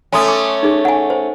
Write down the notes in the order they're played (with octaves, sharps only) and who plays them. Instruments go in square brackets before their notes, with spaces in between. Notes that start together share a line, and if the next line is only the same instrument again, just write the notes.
[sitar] A3 C#4 [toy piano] G#5 C6 D#6
[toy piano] D6
D#4 G#4
F#5 G#5
C5